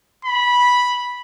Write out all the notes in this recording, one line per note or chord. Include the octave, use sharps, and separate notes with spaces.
B5